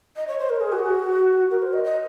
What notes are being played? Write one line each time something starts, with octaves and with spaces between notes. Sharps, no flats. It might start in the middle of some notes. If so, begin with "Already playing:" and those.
D#5
C#5
C5
A#4
G#4
F#4
A#4
C5
D#5
D#5